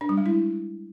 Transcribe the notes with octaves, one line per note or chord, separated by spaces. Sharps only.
D4
G3
G#3
E4